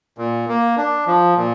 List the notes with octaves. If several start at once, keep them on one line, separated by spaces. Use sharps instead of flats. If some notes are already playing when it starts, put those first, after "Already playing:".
A#2
A#3
D4
F3
A#2